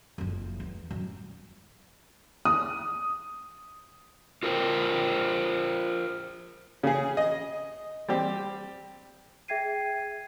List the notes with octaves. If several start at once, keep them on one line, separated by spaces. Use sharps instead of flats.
F#1 F2
E2
F#2 G3
D#6
F4 A#4 C5 G5
C#3 G#4
D#5
G3 C4 G4
G#4 E5 G5 G#6 C7 D#7